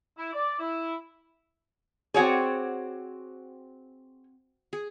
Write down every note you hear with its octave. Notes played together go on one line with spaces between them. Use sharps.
E4
D5
E4
C4 F#4 G#4 C#5 D5 F#5
G#4